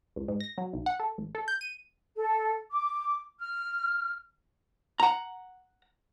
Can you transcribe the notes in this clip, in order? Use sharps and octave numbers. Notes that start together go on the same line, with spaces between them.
C#2
G#2
A#6
F#3
B1
F#5
A4
A1
A4
G6
D#7
A4
D6
F6
F#5 A#5